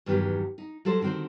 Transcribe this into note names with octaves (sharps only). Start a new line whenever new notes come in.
E2 G2 D#3 F#3 B3 G4
D#4
F#3 G3 A4 C5
D3 D#3 C4 F#4 C5